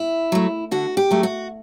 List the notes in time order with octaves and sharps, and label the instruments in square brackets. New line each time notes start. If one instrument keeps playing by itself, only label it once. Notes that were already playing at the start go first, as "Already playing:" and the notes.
Already playing: [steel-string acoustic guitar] E4
F#3 A3
D3 F#4
G4
F#3 A3
F#4